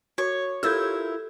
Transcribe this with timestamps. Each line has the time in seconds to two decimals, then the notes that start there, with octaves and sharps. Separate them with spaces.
0.18 F#4 C#5
0.63 E4 F4 G4 A4 A#4 E6 G6 G#6